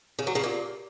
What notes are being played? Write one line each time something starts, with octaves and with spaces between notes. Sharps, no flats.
C#3
F#3
C#3
A#2